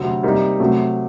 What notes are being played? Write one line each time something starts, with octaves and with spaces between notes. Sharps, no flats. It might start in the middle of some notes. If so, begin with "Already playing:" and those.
Already playing: D2 C3 F#3 C4
C3 G3 A#3 D#4
C3 F#3 A3